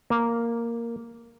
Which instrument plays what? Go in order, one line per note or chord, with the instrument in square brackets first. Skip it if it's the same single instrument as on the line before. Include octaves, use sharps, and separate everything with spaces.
[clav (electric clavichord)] A#3